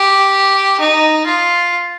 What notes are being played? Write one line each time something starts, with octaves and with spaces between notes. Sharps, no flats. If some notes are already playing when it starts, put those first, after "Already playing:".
Already playing: G4
D#4
F4